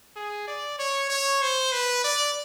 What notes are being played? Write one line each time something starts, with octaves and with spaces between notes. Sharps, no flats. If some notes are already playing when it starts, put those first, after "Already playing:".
G#4
D5
C#5
C#5
C5
B4
D5